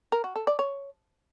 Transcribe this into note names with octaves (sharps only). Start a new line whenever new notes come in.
A#4
F#4
A4
D5
C#5